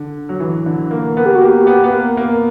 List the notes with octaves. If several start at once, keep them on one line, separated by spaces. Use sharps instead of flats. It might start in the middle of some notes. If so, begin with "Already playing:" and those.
Already playing: D3
F#3
E3
D3
A#3
B3 A#4
G4
F#4
A#3 G4
B3
B3
A#3
A#3